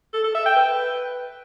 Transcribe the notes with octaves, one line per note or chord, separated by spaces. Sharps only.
A4
A4
E5
G5
B4